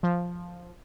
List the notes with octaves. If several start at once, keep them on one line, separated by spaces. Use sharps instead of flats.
F3